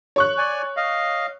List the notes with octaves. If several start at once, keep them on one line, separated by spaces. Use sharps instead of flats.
C#5 C#6 F#6
D5 G#5
D#5 F5